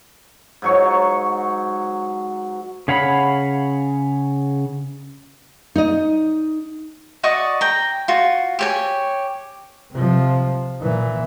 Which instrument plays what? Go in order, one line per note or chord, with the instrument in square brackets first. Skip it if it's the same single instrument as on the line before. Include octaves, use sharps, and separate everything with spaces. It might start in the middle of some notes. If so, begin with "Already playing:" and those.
[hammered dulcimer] G#2 F#3 C#6
[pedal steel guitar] C#3 C#5 F5 F#5 B5
[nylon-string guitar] D#4 D#5
[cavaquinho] F#4 D5 D#5 C#6
G5 A#5
F4 F#4
G4 C#5 G#5
[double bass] C3 F3
A#2 E3